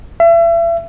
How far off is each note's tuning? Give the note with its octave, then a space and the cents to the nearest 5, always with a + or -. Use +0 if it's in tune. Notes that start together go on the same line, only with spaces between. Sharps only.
E5 +35